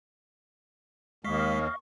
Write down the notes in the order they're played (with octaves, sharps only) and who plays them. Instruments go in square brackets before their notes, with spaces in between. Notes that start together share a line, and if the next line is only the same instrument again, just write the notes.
[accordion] D#2 [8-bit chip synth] G#3 B6 [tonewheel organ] D#5 F5 [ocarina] C#6